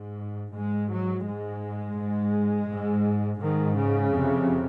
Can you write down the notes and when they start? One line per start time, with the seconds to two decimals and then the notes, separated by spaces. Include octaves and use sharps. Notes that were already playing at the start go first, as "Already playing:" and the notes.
Already playing: G#2
0.54 G#2 G#3
0.91 F#3
1.26 G#2 G#3
1.97 G#2
2.68 G#2
3.40 G#2 D#3
3.76 C#3
4.12 F2 C3